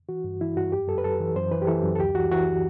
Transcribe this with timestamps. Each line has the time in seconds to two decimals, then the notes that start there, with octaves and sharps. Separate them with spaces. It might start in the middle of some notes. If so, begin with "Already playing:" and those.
0.09 E3 F#4
0.24 G2
0.41 E3 E4
0.56 G2 F#4
0.72 F#2 G4
0.88 F#2 A4
0.98 B4
1.04 F#2 A4
1.20 E3
1.36 F#2 C5
1.52 E3 B4
1.62 G4
1.67 E3 A4
1.83 F#2
1.96 A4
1.99 D2 G4
2.15 E3 F#4
2.31 E3 F#4